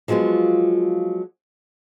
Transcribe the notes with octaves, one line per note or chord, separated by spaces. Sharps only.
F3 F#3 G#3 B3 F4